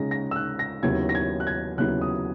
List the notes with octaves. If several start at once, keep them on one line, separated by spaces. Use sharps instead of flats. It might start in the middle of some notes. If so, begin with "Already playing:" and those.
Already playing: C#3 G#3 D#4 A#6
A#6
E6
F#6
A#6
D#2 C#3 F#3 B3 E4 G#6
A#6
G#6
F#6
G#6
D#2 C#3 F#3 B3 E4 F#6
D#6